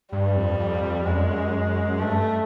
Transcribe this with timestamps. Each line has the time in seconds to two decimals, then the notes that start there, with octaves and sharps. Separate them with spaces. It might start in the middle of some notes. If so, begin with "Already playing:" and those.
0.12 G2 G3
0.36 F2
0.59 F2
0.83 F2
1.06 F#2 G#3
1.99 G2 A3